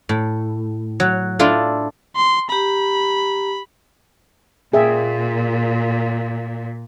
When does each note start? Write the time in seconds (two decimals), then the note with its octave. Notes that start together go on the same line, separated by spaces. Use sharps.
0.09 A2
1.00 F#3
1.39 D4 E4 F4 A4
2.16 C6
2.50 G4 A#5 B5
4.73 A#2 G#4 E5 G5